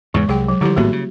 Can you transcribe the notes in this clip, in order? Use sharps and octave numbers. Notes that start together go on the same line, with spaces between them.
E2 G#2 C#3 G#3
C2 F#3 G#4 G5
F#3
D3 F3 G3 E4 G4
G#1 A2 A#3 B3 F#4
C#3